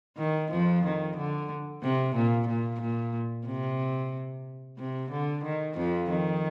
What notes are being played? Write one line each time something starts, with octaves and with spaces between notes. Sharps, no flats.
D#3
F2 F3
D#3
D3
C3
A#2
A#2
A#2
C3
C3
D3
D#3
F2 F3
D#3